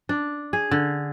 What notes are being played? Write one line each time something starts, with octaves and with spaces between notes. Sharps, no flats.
D4
G#4
D3